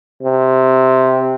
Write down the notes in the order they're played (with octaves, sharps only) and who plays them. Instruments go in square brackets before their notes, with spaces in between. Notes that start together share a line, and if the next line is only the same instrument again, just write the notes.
[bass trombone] C3